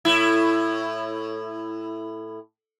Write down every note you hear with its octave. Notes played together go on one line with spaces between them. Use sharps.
A2 E4